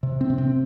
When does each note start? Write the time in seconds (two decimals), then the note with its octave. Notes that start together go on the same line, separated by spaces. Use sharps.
0.03 C3
0.21 C4
0.30 C3
0.38 C4